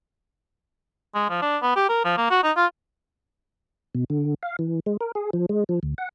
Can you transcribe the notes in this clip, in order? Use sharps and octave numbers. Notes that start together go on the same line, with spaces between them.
G#3
F3
D4
B3
G4
A#4
F3
A#3
F#4
D#4
F4
B2
D3
F5
E3
G#3
A#4
G#4
F3
G#3
F3
D2
F#5